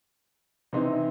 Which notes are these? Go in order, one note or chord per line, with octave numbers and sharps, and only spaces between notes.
C3 E3 C4 D#4